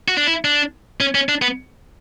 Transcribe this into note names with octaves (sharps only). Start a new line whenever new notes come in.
F#4
D4
E4
D4
C#4
C#4
D4
B3